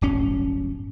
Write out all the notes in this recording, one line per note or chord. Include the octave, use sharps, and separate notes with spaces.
D1 G1 C#4